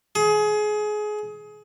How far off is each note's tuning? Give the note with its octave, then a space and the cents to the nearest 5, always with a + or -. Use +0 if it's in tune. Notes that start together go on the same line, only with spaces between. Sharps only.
G#4 +25